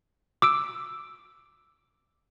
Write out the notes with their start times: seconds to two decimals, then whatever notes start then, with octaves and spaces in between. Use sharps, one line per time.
0.42 D6 E6 D7